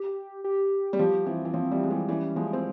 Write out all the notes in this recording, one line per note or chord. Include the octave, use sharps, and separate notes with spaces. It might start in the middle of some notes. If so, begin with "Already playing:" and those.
Already playing: G4
G4
G3
F3 G4
E3 C4
E3
F3 C4
E3 G3
G#3
E3 G3
E3 G3 C#4
F3 G#3 E4
C4